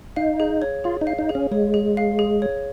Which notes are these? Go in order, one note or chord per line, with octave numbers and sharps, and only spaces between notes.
D#4 F5
G#4
C#5
F4 G#4
D#4
F5
D#4
G#4
C#4
G#3 C#5
G#4
F5
G#4
C#5